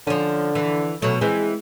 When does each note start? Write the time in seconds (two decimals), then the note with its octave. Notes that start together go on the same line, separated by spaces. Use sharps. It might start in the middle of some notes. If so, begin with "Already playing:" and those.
0.07 D3 F3 C#4
0.55 E3
1.02 B2 F#3 A3
1.21 E3 G#3 C4 G#4